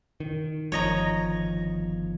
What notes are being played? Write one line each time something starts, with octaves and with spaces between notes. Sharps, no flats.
D#3
G1 D#3 F3 C#5 D#5 A#5